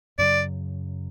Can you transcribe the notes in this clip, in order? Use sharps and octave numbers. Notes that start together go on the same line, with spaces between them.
F#2 C#3 F#3 D5